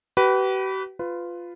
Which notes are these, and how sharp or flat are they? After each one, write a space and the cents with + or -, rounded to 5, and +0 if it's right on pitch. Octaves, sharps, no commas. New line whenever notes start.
G4 -45 B4 +0
F4 +0 B4 +20